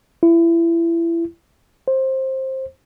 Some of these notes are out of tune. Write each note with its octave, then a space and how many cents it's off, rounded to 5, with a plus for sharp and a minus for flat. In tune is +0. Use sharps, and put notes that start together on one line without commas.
E4 +25
C5 +15